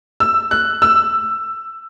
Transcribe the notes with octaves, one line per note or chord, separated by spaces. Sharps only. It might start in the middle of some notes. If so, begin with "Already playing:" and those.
E6
F#6
E6